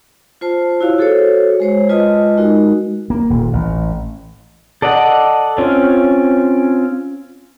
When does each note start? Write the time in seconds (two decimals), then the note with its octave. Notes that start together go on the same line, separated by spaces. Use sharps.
0.41 F4 C5 A5
0.81 E4 F#4 C#5 F5
0.98 F#4 G#4 A4 C5 C#5
1.60 G#3 C5 C#5
1.89 G#3 F4 B4 D#5 A5 D#6
2.38 G#3 D#4 F#4 A#4
3.10 A#3
3.30 D#1
3.53 A1
4.82 A4 D5 D#5 F#5
5.58 C4 C#4 F4